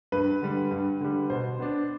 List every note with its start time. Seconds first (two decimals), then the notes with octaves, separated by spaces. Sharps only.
0.12 G2 B4
0.42 D3 G3
0.71 G2
1.00 D3 G3
1.30 B2 C5
1.59 B3 D4